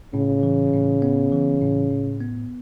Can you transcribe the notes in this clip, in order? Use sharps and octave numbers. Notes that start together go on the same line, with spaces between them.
A2 C#3
E3
A2
B3
E3
A2
A2
B3